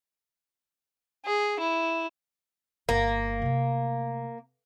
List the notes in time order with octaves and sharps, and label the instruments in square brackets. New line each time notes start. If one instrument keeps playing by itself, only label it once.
[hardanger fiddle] G#4
E4
[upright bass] G1 [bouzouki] A#3
[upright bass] C3 A3